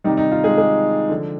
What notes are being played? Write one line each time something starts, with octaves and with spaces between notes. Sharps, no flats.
C3 D#3 G3 D#4
D#4
F4
G#3 G#4
G#3 G#4
D3 F3